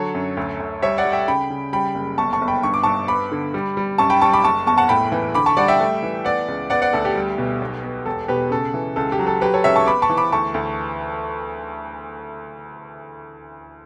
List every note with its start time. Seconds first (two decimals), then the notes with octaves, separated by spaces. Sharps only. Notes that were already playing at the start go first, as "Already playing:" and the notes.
Already playing: D3 F#3 A4 C#5
0.14 F#2
0.37 D2
0.60 D2
0.82 G3 C#5 E5
0.98 D5 F#5
1.05 G3
1.12 E5 G5
1.28 C#3 G5 B5
1.50 C#3
1.73 G3 G5 B5
1.95 F#1
2.18 G1 A5 C#6
2.33 A5 C#6
2.41 G1
2.48 G5 B5
2.63 G2 C#6
2.74 D6
2.83 G2 A5 C#6
3.08 B3 B5 D6
3.32 D3
3.54 G3
3.77 G3
3.98 F#2 A5 C#6
4.10 G5 B5
4.22 G3 A5 C#6
4.33 B5 D6
4.44 F#1 A5 C#6
4.67 E2 A5 C#6
4.78 F#5 A5
4.89 A2 G5 B5
5.12 E3
5.34 D3 B5 D6
5.46 A5 C#6
5.57 G3 D5 F#5
5.68 E5 G5
5.81 A3
6.03 E3
6.25 B3 D5 F#5
6.48 C#2
6.70 B3 D5 F#5
6.82 D5 F#5
6.93 D2 A4
7.05 G4
7.15 G3
7.38 B2
7.61 B1
7.84 B3
8.06 E1 A4
8.28 B2 G4 B4
8.51 C#3 A4
8.74 E3
8.96 C#2 A4
9.12 G4
9.19 F#3
9.27 A4
9.41 F#3 G4 B4
9.54 A4 C#5
9.64 C#2 C#5 E5
9.76 A5 C#6
9.86 B3 B5 D6
10.02 A5 C#6
10.10 E3
10.17 B5 D6
10.32 D2 A5 C#6
10.54 D2